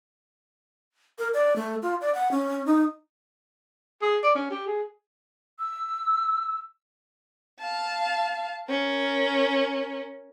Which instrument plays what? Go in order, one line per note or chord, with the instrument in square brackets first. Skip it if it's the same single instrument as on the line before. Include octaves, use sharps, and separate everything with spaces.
[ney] A#4
D5
A3
F4
D5
F#5
C#4
D#4
[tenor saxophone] G#4
D5
C#4
G4
G#4
[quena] E6
[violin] F5 A5
C#4 A#4